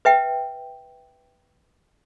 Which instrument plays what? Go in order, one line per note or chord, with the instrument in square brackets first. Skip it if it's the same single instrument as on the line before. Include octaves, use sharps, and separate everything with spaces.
[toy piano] B4 E5 G5